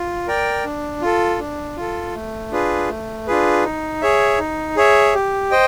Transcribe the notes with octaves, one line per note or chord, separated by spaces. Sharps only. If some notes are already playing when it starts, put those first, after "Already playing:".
Already playing: F4
A#4 D5 G5
D4
F4 A4
D4
F4 A4
A3
D4 F4 G#4 B4
A3
D4 F4 G#4 B4
D#4
G#4 C#5 E5
D#4
G#4 C#5 E5
G4
C5 D#5 G5